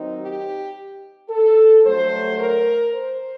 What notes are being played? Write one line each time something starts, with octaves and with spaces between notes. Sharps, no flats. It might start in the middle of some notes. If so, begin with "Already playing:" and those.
Already playing: D#3 F#3 C4 D#4
G4
A4
G2 F#3 A3 C5
A#4
C5